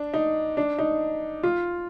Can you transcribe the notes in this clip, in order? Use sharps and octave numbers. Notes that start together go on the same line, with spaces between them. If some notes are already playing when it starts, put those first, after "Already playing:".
Already playing: D4
D#4
D4
D#4
F4